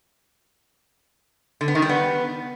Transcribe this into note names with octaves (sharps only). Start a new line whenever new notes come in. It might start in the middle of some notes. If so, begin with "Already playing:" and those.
D3
B3
D#3
G3
B3